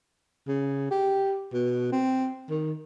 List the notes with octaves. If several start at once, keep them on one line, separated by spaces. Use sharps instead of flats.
C#3
G4
B2
C4
D#3